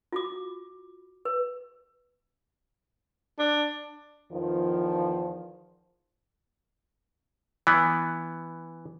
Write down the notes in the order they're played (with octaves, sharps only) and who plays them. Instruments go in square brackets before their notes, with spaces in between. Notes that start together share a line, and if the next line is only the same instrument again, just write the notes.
[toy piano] F4 F#4 D6
B4
[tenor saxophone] D4
[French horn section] E2 D#3 F3
[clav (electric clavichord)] E3 B3